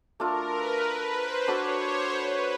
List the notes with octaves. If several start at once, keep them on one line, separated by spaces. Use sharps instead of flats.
A3 D4 F4 A4 A#4
B4
B4
C5
D4 F#4 A4 C#5 D5
C5
B4